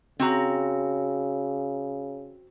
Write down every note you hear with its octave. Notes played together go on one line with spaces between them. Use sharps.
C#3 C4 F#4 A#5